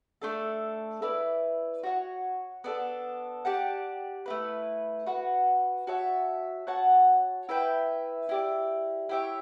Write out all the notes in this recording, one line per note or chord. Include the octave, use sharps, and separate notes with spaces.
A3 D4 A4
E4 B4 D5
F#4 C#5 F#5
B3 D4 A4
G4 D5 F#5 A5
A3 E4 B4
F#4 B4 F#5
F#4 C#5 E5 A5
F#4 C#5 F#5 A5
E4 B4 E5 G5
E4 G4 D5
E4 G4 C#5 E5